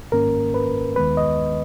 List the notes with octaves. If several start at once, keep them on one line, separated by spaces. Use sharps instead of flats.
G#2 D#3 A#3 C#4 A#4
B4
D#2 D#3 G#3 B3 B4
D#5